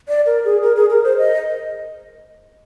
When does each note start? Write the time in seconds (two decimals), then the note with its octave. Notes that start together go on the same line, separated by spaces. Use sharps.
0.08 D5
0.26 A#4
0.45 G#4
0.63 A#4
0.76 G#4
0.90 A#4
1.04 C5
1.18 D#5